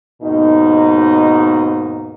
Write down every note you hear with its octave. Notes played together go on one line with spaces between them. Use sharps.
D#2 G#2 B2 D#4